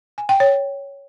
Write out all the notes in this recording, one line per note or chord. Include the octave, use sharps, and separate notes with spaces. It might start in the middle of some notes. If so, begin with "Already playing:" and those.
G#5
G5
C#5